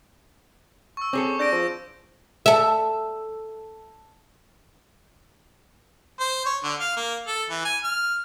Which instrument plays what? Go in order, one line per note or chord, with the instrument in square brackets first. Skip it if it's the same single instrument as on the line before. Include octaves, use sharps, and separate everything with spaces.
[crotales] C#6 E6
[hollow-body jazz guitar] C4 G#4 A4 [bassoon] C#4 [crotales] D6
[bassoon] D4 [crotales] G6 A#6 D7
[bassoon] F3
[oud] A4 E5
[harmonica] C5
C#5
D3
F5
A#3
A4
E3
G#5
F6